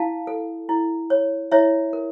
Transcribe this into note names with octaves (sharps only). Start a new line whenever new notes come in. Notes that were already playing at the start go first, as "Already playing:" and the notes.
Already playing: E4 F5 A5
A4
E4
C#5
E4 C#5 E5
A#4